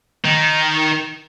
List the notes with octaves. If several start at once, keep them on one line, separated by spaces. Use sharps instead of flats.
D#3